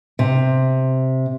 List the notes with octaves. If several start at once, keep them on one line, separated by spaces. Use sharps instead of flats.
C3